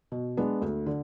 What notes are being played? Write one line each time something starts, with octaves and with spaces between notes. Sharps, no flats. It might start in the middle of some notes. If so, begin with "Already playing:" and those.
B2
G#3 B3 D4
D2
D3